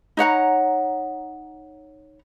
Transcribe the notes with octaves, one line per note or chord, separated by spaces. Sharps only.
D#4 C#5 F#5 A#5